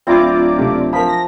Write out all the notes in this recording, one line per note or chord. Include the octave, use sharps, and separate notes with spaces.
D1 C4 E4 F4 D5 A#5 D6
C3 A3
F3 A#4 B5 B6
A#6